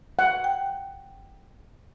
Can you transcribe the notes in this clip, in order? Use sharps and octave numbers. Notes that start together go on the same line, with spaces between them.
F#5
G5